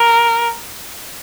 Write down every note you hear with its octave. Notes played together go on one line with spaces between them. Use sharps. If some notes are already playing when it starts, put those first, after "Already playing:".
Already playing: A#4